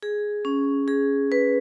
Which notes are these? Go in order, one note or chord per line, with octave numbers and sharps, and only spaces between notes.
G#4
C#4
G#4
B4